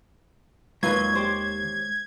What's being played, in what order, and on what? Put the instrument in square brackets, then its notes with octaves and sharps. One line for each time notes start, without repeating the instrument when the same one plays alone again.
[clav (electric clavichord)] D#2 D#3 [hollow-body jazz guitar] F#3 F4 B4 [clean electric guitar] G#3 C6 [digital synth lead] G#6
[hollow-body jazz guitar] G4 C5 C#5